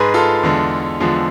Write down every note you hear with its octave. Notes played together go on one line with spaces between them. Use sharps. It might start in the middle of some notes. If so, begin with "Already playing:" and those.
Already playing: G#2 G#3 G#4 B4
F4 A4
E2 D3 G#3
E2 D3 F3 G#3